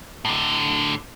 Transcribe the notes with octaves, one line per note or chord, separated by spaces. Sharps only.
A2 D3